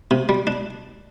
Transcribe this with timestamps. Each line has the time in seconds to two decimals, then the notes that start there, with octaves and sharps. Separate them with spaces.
0.11 C3
0.29 G3
0.47 D4